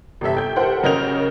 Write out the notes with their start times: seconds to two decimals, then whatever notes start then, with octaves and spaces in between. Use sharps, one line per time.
0.21 G1 C3 A4 E5
0.37 G5 G6
0.56 G4 A4 A#4 C5 F#5 G5
0.83 F#2 C#3 A#4 D#5 G6 F7